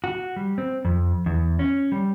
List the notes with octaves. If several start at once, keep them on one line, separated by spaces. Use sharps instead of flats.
F#4
G3
C4
F2
E2
C#4
G3